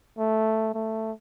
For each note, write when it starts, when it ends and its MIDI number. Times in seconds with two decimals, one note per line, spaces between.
0.18 0.74 57
0.74 1.12 57